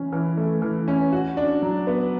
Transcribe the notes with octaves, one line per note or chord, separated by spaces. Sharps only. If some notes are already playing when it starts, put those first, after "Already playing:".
Already playing: E3 C#4
E3
A3
E3
C#4
F#4
D4
F#3
B3